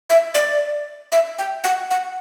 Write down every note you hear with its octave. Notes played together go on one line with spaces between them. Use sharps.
E5
D5
E5
G5
F#5
F#5